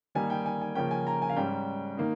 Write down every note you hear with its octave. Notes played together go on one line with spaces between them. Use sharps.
D#3 G3 A#3 D#4 G#5
G5
G#5
G#5
C#3 F3 A#3 C#4 G5
G#5
A#5
G#5
F5
G#2 G3 C#4 G5
D#3 A#3 D#4